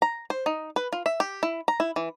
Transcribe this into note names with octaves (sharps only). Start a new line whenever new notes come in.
A#5
C5
D#4
B4
F4
E5
G4
E4
A#5
E4
E3